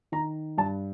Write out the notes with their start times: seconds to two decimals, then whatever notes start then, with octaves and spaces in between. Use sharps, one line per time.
0.12 D#3 A#5
0.58 G2 A5